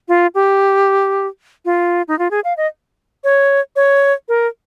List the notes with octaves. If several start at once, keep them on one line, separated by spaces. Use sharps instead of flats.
F4
G4
F4
D#4
F4
G#4
F5
D#5
C#5
C#5
A#4